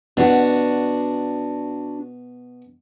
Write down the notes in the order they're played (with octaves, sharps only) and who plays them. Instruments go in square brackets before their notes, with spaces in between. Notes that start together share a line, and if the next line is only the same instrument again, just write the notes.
[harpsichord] B2 [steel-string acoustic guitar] D4 F#4